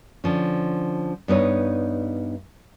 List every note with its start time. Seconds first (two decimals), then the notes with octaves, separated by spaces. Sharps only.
0.24 D3 F3 C#4
1.28 G2 B3 D#4 C#5